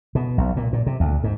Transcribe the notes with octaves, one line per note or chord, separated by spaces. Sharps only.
B2
B1
A#2
A#2
C3
D2
G#2